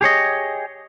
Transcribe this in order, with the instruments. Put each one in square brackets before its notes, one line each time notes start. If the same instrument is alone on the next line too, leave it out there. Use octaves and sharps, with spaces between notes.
[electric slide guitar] G4 G#4 C#5 D#5